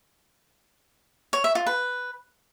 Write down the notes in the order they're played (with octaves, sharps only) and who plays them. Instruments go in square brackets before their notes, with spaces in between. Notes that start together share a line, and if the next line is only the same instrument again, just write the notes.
[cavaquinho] C#5
E5
F4
B4